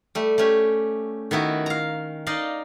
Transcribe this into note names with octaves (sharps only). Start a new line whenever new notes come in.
G3 A3
A3 C#4 G4
D#3 B3 E4 F#4
F5 A#5
D#4 D5 D#5 F5